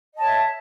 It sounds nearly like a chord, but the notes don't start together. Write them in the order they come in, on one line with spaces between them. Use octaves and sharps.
D#5 A5 C#5 E5